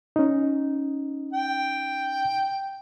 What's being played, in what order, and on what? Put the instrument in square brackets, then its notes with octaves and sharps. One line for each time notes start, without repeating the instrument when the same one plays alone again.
[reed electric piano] C#4 D#4
[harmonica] G5